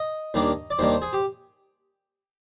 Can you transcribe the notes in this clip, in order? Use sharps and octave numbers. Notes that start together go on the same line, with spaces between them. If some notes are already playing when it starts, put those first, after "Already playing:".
Already playing: D#5
D#2 D#3 G3 A#3 D4
D5
D#2 D#3 G3 A#3 D4 C5
G#4
G4